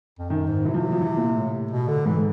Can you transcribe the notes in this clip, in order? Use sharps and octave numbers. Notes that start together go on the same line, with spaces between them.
F2
F#2 D#3
G#2
C3 E3
F3
F#3
F3
E3
A#2
A2
B2
D3
G#2 E3